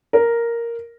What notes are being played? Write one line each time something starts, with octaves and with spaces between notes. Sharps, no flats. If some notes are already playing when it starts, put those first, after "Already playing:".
A#4